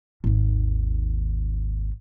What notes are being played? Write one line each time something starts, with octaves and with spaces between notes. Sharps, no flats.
G#1 D#2